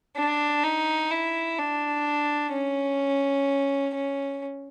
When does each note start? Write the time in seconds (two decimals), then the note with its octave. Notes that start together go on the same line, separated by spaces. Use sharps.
0.17 D4
0.64 D#4
1.11 E4
1.59 D4
2.53 C#4
3.95 C#4